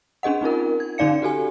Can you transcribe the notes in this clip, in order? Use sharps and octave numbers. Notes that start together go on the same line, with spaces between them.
C#4 D4 G#4 D#5 F#5
C4 D#4 F4 A#4
G#6
D3 C#4 D#4 D5 F5 C#7
F#4 G4 A4 G#5